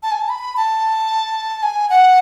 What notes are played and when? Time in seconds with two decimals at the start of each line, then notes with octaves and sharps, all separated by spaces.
0.03 A5
0.12 G#5
0.20 A5
0.29 B5
0.57 A5
1.63 G#5
1.90 F#5